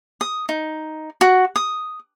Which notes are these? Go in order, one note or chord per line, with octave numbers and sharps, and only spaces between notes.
D#6
D#4
F#4
D#6